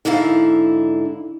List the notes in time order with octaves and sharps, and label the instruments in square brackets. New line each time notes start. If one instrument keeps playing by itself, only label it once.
[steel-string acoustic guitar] G#2 D3 D#4 E4 F5